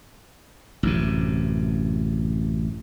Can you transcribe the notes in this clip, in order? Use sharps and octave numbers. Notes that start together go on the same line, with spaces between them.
A1 F#2 C3